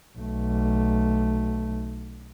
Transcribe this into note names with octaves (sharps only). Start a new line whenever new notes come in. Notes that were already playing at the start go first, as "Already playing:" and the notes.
B1 A3